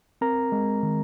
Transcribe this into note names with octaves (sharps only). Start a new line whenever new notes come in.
C4 A#4 A#5
G#3
D#3